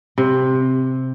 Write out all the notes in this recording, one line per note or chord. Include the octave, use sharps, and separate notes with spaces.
C3